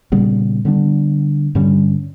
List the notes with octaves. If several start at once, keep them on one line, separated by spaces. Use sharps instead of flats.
A#2 C#3 G3 B3
D3 G3 B3 D4
G2 D3 G3 C#4